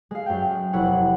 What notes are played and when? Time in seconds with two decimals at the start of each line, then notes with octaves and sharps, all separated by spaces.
0.11 G#3 F5
0.26 F#2 G5
0.73 F1 E4 C#5 F#5